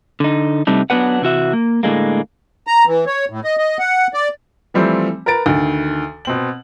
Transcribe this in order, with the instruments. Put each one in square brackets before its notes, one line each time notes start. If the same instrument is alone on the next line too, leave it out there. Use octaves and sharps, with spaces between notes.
[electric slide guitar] D3 D#4
C3 G3 A3 C4 D4 D#4
F#3 B3 D4 B4 F#5
C3 E3 F#4 E5
A#3
A2 D3 G#3 A#3
[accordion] A#5
E3
C#5
A2
D#5
D#5
F#5
D5
[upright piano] E3 F3 G3 A3 C4
A#4 B4 A#5 A6 D7
D2 D#3
B2 C4 F#7